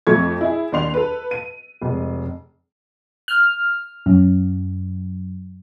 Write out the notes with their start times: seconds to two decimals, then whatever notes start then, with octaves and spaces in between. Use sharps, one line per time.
0.07 F2 A3 C#6 G#6
0.41 E4 G#4
0.72 D#2 D4 C6 F7
0.94 A4 B4
1.31 D#7
1.82 F1 G#3
3.28 F6
4.06 F#2